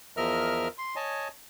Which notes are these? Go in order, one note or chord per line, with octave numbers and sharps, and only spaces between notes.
E2 F3 A#4 D#5 E5 F6
C6
C#5 D#5 G#5 A5